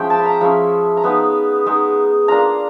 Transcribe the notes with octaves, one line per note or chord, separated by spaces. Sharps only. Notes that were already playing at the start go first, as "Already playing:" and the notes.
Already playing: F3 G#3 C#4 E4 G5
A5
B5
A#5
F3 G#3 C#4 E4 B5
A#5
G#3 B3 D#4 B5
G#3 B3 D#4
A#3 D4 F4 A#5